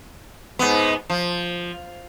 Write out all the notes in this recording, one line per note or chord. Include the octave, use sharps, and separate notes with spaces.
G#2 B3
F3